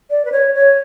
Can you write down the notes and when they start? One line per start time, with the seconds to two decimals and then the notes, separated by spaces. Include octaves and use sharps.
0.10 D5
0.24 B4
0.31 C#5
0.54 C#5